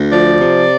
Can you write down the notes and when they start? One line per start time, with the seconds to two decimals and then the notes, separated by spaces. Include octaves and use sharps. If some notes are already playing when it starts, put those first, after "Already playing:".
Already playing: D2
0.12 F3 D5
0.41 C3